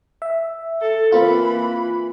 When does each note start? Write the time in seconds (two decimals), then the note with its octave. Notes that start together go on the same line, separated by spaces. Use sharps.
0.22 E5
0.81 A4
1.12 E3 A#3 C4 F4 B5